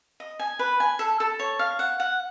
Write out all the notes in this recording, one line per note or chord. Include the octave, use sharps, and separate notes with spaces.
D#5
G#5
B4
G#5
A4
A4
C#5
F5
F#5
F#5